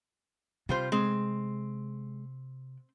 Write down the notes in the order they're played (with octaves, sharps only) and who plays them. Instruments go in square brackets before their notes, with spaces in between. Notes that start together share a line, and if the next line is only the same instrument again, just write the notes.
[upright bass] C3 [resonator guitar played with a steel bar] G3 F4 C5
[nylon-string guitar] G#3 [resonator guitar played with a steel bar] C4